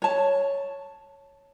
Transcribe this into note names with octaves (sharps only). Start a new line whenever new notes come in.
C#5 A5